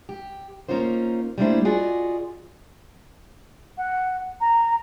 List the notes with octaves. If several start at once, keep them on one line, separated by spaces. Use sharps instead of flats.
G4
A#3 C#4 D#4 F4 C5
G3 A3 A#3 D4 E4 C5
F4 F#4 G#4 D5 D#5
F#5
A#5